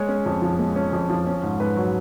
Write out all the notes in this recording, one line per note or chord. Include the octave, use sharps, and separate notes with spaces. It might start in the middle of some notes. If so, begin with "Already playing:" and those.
Already playing: G#3 C#5
C#4
F2
F3
G#3
C#4
F2
F3
C#4
G#2
G#2 B4
F#3